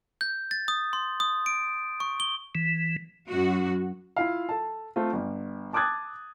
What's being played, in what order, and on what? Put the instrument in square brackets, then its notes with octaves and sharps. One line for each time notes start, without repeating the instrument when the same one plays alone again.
[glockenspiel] G6
A6
D#6
C6
D#6
D7
C#6
G7
[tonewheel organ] E3
[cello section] F#2 F#4
[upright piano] E4 F4 F5
A4 A5
A3 C4 F4
G1
A5 D6 D#6 F#6 G#6 A6